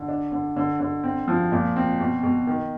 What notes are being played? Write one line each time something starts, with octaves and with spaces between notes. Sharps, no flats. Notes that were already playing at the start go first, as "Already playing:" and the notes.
Already playing: D3
D4
D3
D3
D3
C4
F3
A#2
C4
B2
B2
D#3